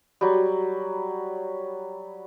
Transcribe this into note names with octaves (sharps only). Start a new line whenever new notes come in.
F#3 G3